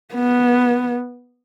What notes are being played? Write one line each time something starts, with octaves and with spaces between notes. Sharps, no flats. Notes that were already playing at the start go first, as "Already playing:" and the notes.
B3